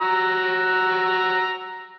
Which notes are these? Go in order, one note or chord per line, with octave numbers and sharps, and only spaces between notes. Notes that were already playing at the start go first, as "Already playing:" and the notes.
F#4 A#5 E6